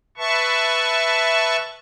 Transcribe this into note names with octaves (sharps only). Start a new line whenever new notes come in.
B4 E5 A5 C#6